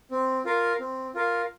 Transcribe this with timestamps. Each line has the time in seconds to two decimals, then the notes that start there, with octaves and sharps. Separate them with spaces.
0.11 C4
0.45 F4 A#4 F5
0.80 C4
1.15 F4 A#4 F5